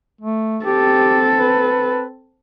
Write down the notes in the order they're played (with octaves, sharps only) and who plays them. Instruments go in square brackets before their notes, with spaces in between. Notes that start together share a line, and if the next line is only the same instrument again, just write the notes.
[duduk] A3
[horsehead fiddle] C4 A4 [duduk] G4
[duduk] B4